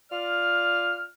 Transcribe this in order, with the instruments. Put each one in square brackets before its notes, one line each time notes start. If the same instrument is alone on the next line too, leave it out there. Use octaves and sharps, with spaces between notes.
[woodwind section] F4 D5 F6